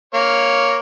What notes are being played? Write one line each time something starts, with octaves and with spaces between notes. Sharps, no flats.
A#3 C#5 F5